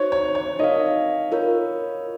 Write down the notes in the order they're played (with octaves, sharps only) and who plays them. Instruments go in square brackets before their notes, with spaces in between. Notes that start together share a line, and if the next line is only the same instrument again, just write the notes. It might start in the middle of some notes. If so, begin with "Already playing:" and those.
Already playing: [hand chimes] D#4 F#4 C5 [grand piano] C#5
[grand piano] C#5
C#5
[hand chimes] D#4 A#4 F5 [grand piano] D#5
[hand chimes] F4 A#4 C#5